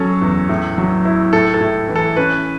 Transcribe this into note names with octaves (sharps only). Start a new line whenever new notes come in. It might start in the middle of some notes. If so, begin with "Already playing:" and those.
Already playing: F#3 C#4 A4
E2
A2
F#3
E4
A2 A4
A4
A2
E3
A4
C#4 B4